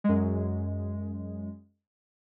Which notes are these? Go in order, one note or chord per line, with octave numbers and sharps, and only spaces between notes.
F#2 G#3